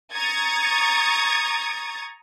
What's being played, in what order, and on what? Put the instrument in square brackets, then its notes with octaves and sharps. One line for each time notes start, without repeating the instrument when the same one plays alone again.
[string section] A#5 C#6 D#6 G#6 A6